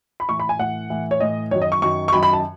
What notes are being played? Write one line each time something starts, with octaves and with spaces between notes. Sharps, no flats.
B5
A2 E3 C#6
B5
G#5
A2 E3 F#5
A2 E3
C#5
A2 E3 D#5
F#2 D#3 F#3 C#5
D#5
C#6
F#2 D#3 F#3 C#6
C#6
F#2 D#3 F#3 B5
B5
A5